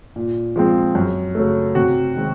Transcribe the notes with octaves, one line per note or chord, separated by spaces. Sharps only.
A#2
F3 G#3 C4
F#2
C#3 F#3 A3
C3 F#4
D#3 G#3 C4